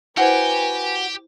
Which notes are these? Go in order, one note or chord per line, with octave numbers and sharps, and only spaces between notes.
E4 F#4 G4 B4 C5 G#5 G#6